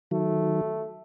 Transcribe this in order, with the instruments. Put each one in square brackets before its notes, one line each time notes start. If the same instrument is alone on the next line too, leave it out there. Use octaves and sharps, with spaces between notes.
[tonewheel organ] D#3 F#3 [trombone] A3